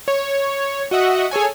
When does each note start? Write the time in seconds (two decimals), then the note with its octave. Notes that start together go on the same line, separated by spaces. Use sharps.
0.08 C#5
0.91 F#4 D#5 E5 F#5
1.31 G#4 A4 C#5 G#5